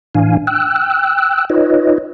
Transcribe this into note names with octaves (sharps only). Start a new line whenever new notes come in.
A2 E3 D4 F5 G#5
G5 E6 F#6
D#4 F4 B4 C#5 D#5